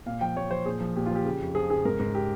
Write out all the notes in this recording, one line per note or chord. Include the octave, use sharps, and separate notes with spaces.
A#2 F5
F3 G5
A#2 C#5
F3 C5
A#2 G#4
F3
A#2 G4
F4
F3 G4
C#3
F2
F3 G#4
C#3 G#4
G#2 A#4
G#2 A#4
G4